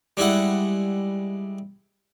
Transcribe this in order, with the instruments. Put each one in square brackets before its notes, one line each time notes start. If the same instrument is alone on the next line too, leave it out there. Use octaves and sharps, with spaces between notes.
[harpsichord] G3 G#3 E4 F#5